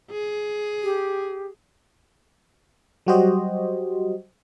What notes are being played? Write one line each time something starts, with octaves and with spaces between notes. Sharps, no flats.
G#4
G4
F#3 G3 F#4 G4 C5 D#5